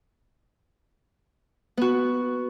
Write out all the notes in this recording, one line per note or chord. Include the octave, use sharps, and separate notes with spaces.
B3 F#4